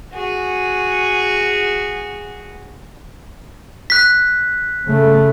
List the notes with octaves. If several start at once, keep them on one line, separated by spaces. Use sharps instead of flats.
F#4 G#4
F#6 B6
C#3 A3